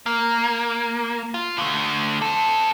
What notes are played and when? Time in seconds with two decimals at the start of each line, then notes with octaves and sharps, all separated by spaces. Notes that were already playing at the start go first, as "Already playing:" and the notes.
0.06 A#3
1.34 F4
1.58 D3 A3
2.22 C4 A4